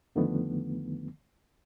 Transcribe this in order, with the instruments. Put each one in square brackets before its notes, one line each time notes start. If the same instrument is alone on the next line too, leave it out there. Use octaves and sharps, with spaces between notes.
[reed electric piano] F2 D3 D#3 F3 A3 B3